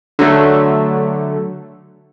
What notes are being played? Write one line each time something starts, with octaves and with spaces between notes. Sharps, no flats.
D3 F#3 A3